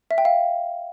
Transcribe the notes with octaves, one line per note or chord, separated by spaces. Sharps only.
E5
G5
F5